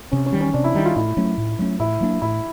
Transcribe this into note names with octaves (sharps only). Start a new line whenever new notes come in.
C3 C#4
C#4
D#3 G3
C#4
C3 D4
E4
D#3 G3 D#4
F4
A2 E4
F#3 A3 C#4
A2
F#3 A3 C#4
A2 E4
F#3 A#3 D4
A2 E4